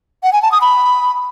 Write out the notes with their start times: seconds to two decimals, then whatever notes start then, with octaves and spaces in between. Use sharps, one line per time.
0.23 F#5
0.33 G#5
0.42 A5
0.52 D#6
0.61 B5